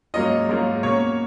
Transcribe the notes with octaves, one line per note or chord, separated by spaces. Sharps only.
G#2 F#3 A#3 C#4 F4 D#5
G#2 F#3 A#3 C#4 F4
B2 A#3 C#4 C#5